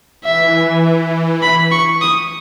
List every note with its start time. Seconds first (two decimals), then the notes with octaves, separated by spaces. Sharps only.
0.24 E3 E5
1.42 B5
1.72 C#6
2.01 D#6